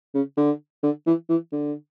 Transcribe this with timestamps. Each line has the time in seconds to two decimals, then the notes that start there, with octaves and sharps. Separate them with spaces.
0.15 C#3
0.37 D3
0.83 D3
1.06 E3
1.29 E3
1.52 D3